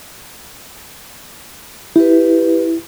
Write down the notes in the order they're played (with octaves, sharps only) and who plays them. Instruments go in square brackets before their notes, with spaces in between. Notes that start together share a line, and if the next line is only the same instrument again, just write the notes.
[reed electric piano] E4 [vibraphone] G4 B4